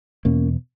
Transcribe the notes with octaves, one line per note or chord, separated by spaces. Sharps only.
E2 B2 A#3 C#4